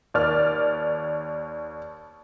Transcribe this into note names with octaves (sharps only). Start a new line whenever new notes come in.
D#2 D5 F6